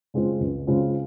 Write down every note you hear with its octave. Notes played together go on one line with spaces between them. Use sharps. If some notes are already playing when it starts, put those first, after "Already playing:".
C#3 G#3 C4 F4
C#2
C#3 G#3 C4 F4